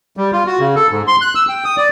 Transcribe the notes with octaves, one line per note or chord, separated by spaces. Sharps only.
G3
F4
F#4
C#3
A4
G#2
C6
F#6
E6
G5
D#6
D5